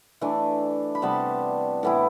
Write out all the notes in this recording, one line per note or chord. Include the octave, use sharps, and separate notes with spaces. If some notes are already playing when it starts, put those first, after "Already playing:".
E3 A3 D4
B5
C3 G3 B3 A5
A2 E3 B3 E4